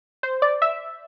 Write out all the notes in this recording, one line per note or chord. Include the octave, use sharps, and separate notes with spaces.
C5
D5
E5